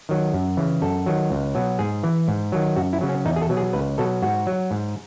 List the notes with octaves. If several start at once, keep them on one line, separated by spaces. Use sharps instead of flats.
D#3 F#3
F#2
C#3 E3
F#2 A4
D#3 F#3
C#2
B2 F#3
G#2 G#4
E3
G#2
D#3 F#3
F#2 F#4
E4
C#3 F#3
C#4
E2 D#4
G#4
A4
B2 F#3
G#4
C#2 B4
B2 F#3 A4
G#2 F#4
F#3
G#2